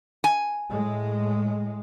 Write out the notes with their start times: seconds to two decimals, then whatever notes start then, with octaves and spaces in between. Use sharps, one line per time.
0.24 G#5
0.72 A2 G#3